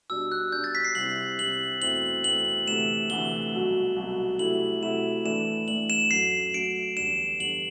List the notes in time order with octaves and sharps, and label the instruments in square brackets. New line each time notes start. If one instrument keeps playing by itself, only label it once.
[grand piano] B2 G3 D4 [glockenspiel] E6
[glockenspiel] F#6
[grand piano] B2 G3 D4 [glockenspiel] G6
[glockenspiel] A6
B6
C7
[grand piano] C2 C3 G3 C4 E4 [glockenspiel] F#7
[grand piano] C2 C3 G3 C4 E4 [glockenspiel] F#7
[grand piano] E2 B2 A3 C4 E4 [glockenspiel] F#7
[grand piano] E2 B2 A3 C4 E4 [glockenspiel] F#7
[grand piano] D2 C3 E3 A3 [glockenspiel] E7
[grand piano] D2 C3 E3 A3 [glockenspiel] G7
[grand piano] C2 B2 F#3
C2 B2 F#3
[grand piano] C3 F#3 A3 E4 [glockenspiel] F#7
[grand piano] C3 F#3 A3 E4 [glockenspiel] E7
[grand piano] A2 E3 A3 D4 [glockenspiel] E7
[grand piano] A2 E3 A3 D4 [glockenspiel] F#7
[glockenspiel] E7
[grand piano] F#2 F#3 A3 [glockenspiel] C7
[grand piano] F#2 F#3 A3 [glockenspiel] D7
[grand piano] E2 D3 G3 D4 [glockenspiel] E7
[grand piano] E2 D3 G3 D4 [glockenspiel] F#7